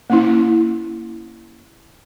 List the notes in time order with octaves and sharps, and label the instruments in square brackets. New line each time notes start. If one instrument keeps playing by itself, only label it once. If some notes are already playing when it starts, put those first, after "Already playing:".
[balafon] A#3 C#4 E4